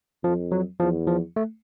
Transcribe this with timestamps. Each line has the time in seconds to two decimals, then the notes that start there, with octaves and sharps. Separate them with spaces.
0.24 F2 F3
0.52 F#3
0.80 E2 F3
1.07 F3
1.36 A3